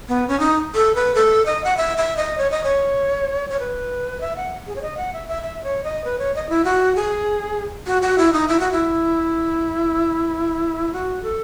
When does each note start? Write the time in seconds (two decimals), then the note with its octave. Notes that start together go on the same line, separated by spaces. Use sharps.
0.08 B3
0.28 C#4
0.40 D#4
0.75 A4
0.95 B4
1.15 A4
1.46 D#5
1.64 F#5
1.77 E5
1.97 E5
2.17 D#5
2.38 C#5
2.51 D#5
2.64 C#5
3.50 C#5
3.60 B4
4.21 E5
4.37 F#5
4.67 G#4
4.76 C#5
4.82 D#5
4.97 F#5
5.13 E5
5.28 E5
5.42 E5
5.64 C#5
5.84 D#5
6.05 B4
6.19 C#5
6.35 D#5
6.49 E4
6.65 F#4
6.96 G#4
7.87 F#4
8.02 F#4
8.18 E4
8.33 D#4
8.48 E4
8.60 F#4
8.72 E4
10.93 F#4
11.23 A4